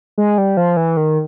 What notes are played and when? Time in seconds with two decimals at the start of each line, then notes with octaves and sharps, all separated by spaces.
0.18 G#3
0.38 G3
0.57 F3
0.77 E3
0.97 D#3